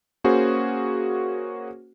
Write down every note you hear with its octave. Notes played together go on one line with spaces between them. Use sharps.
A#3 C#4 F#4 G#4 C5